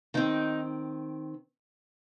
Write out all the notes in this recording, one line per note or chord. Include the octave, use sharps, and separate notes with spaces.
D#3 C4 D#4